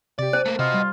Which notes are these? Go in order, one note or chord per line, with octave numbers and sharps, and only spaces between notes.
C3 G4 D5
C5 D#7
A3 A#3
C3 F4 F#4 D#5
G3